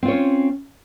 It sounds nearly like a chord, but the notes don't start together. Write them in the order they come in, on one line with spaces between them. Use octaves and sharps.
C4 F4 C#5 C#4